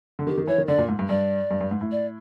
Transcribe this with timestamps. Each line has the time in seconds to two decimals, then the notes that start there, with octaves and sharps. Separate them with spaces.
0.19 D3
0.27 D#3 G4
0.38 D#3
0.47 E3 C#5
0.58 D#3
0.68 D3 D5
0.78 A#2
0.88 G#2
0.99 G2
1.09 G2 D5
1.51 G2
1.61 G2
1.71 G#2
1.81 A2
1.92 D5